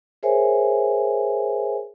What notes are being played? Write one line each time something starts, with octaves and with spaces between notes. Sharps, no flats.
G#4 A#4 C5 C#5 E5 G#5